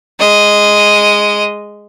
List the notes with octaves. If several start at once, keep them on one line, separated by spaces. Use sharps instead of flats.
G#3 D#5